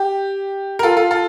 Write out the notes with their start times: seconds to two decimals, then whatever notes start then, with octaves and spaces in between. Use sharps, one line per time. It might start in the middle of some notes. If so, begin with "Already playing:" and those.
Already playing: G4
0.79 A#4
0.83 F4 A4
0.97 F4 A4
1.11 F4 A4